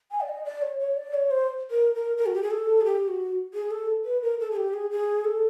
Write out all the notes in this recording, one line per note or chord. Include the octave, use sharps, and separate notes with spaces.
G#5
D5
D#5
D5
C#5
C#5
D5
C#5
C5
A#4
A#4
A#4
F#4
G4
G#4
A4
G#4
G4
F#4
G#4
A4
B4
A#4
A4
G#4
G4
G#4
G#4
A4